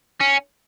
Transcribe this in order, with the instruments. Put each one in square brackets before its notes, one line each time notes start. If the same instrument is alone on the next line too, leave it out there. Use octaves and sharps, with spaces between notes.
[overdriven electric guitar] C#4